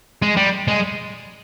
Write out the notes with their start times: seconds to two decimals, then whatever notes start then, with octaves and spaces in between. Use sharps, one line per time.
0.22 G#3
0.36 G3
0.68 G#3